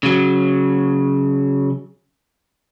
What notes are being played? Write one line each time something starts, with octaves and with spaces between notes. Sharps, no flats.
C#3 F#3